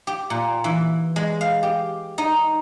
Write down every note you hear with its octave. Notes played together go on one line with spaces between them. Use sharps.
G4
A#2
E3
G#3
F5
G4
D#4